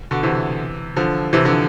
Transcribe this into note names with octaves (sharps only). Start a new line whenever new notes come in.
B2 D3
C3 E3
D3 F3
C3 E3
D3 F3